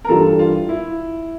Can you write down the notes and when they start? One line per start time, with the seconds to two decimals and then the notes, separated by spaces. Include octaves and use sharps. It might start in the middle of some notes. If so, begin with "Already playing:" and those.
0.05 A#4
0.09 G2 E3 G3 D4 F4 A4
0.39 F4
0.69 E4